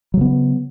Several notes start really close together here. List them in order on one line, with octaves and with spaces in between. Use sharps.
F#3 C#3 B3